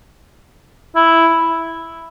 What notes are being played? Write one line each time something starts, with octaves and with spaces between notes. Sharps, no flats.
E4